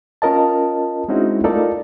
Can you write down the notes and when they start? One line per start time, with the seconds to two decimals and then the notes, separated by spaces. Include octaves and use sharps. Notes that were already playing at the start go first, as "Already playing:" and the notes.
0.22 C#4 F4 A#4 D#5 A5
1.08 G#3 C4 C#4 D#4 E4 F#4
1.44 A3 D#4 F4 A4 A#4 D5